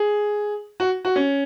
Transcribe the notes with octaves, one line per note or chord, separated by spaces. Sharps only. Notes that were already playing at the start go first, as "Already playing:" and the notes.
Already playing: G#4
F#4
F#4
C#4